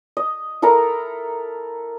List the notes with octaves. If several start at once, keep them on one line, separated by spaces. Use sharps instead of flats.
D#5
E4 A4 A#4 A#5